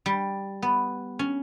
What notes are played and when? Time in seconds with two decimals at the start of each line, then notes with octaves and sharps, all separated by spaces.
0.06 G3
0.62 B3
1.19 C#4